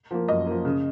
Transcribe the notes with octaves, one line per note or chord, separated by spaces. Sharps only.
F3 A#3
F#2 D#5
F3 A#3
C#3